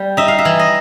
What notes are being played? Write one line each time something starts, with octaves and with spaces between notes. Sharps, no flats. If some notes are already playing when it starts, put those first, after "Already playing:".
Already playing: G3
D#4 E5
F5
E5
E3
D#5